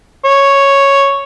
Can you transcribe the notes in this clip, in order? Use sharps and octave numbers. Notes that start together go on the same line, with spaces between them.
C#5